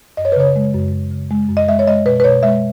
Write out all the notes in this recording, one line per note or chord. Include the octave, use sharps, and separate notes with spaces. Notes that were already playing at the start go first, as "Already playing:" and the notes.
F#2 D#5
C#5
B4
C#3 C#5
G#3
F#2
F#2
C#3
G#3
F#2
D#5
G#3 E5
C#5
G#3 D#5
B2 B4
B4
B2 C#5
G#3 E5